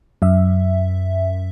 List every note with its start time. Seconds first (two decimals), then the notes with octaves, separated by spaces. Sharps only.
0.22 F#2 E5